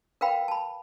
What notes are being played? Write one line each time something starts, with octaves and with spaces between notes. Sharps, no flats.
A#4 B4 F5 G5 B5
A5 B5